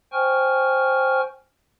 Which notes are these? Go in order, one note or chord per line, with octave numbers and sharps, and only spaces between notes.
C5 G5 G#5 C#6 F6